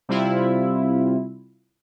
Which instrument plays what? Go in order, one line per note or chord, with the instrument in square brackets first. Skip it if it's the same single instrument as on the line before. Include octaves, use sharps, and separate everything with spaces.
[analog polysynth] C3 G3 C4 E4 F4